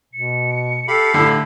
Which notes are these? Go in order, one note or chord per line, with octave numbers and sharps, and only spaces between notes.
B2 C#7
G4 A4 F5 B5
A2 D3 D4 E6